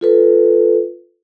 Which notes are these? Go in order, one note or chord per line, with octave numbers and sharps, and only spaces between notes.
F4 A4 B4